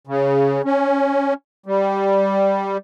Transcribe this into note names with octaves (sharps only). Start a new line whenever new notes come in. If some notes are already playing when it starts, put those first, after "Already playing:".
C#3
C#4
G3